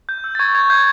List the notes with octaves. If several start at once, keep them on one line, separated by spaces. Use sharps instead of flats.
G6
E6
A6
C#6 G#6
C#6 G#6
G6